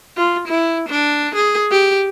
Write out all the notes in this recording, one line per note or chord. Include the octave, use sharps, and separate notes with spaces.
F4
E4
D4
G#4
G4